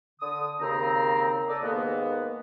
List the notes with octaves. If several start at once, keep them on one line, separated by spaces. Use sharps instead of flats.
D3 D#6
D#2 C#3 C4 A#5
A4 A#4 D5 D#5
D#2 G#2 G#3 A#3 B3